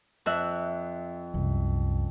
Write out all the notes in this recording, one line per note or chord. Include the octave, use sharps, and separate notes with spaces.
F2 E5 F#6
C2 F#2